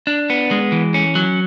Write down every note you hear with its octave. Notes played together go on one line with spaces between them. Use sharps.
D4
B3
G#3
E3
C#4
F#3